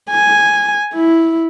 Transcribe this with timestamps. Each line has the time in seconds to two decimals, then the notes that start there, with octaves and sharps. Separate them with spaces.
0.10 G#5
0.93 E4